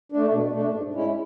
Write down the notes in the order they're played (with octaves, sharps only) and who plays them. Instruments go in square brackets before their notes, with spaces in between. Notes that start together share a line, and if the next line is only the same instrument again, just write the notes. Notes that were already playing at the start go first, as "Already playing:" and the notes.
[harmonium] A3 D4
B2
A3 D4
G#2
G#3 C#4 E4